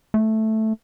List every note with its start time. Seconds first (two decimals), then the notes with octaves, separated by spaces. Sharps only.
0.14 A3